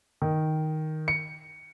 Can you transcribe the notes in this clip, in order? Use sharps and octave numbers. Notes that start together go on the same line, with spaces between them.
D#3
C#7